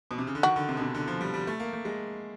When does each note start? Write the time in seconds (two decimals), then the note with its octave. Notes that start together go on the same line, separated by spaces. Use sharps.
0.11 B2
0.18 C3
0.27 C#3
0.35 D3
0.43 D#3 F#4
0.56 D3
0.69 C3
0.77 B2
0.81 C3
0.94 D3
1.07 F3
1.21 G3
1.34 G3
1.47 A3
1.60 A#3
1.73 A3
1.85 G#3